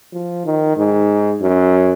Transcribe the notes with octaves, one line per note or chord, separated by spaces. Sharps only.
F3
D#3
G#2
F#2